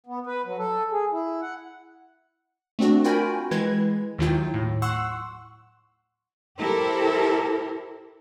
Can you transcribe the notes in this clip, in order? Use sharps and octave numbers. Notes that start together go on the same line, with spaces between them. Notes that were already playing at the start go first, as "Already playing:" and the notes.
B3
B4
F#3
A4
G#4
E4
F#5
A3 C4 D4 F#4
F4 F#4 A#4 G5 G#5 B5
E3 G#3 B4 G#6
D#2 D#3 F#3 E4 F4 G5
A2
F#5 C6 C#6 E6 F#6
E4 G4 A4 A#4 C5